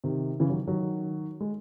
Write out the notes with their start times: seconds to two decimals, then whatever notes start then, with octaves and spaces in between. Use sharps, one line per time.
0.04 C3 D#3
0.40 C#3 E3
0.50 D#3 F#3
0.67 D#3 F#3
1.41 G#3